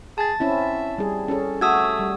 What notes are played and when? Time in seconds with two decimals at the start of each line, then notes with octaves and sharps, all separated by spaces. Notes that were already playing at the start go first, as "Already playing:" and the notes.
0.18 G#4 A5 A6
0.40 C4 C#4 E4 E5
0.98 G3 G#4
1.28 C#4 G#4 A4
1.61 A3 F#4 D#6 E6 G#6
1.99 G3